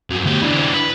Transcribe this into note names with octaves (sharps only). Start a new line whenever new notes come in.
F2 F#3
D2 G4
E3 D4
B4